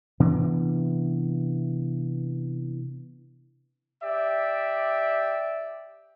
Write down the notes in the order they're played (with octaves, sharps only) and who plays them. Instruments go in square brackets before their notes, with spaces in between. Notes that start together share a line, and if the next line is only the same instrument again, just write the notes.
[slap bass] C3 E3 B3 D4
[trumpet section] G4 D5 E5